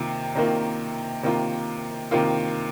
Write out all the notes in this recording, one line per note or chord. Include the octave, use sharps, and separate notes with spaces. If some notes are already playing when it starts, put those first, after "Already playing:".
Already playing: C3 D#3 A#3 F4
C3 D#3 A#3 F4
C3 D#3 A#3 F4
C3 D#3 A#3 F4